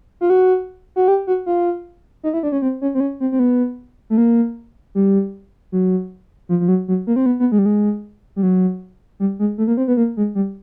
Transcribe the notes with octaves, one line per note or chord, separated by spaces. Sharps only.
F4
F#4
F#4
G4
F#4
F4
D#4
E4
D4
C#4
C4
C#4
C4
C#4
C4
C4
B3
A3
A#3
G3
F#3
F3
F3
F#3
F#3
A#3
C4
B3
B3
G#3
G3
G#3
G3
F#3
G3
G#3
A3
A#3
C4
B3
A#3
G#3
G3